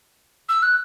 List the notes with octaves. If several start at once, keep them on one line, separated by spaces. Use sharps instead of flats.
E6
F#6